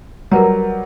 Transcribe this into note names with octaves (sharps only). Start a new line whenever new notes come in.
F#3 G3 A#4 B4 A#5